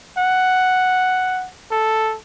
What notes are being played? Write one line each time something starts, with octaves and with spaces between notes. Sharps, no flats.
F#5
A4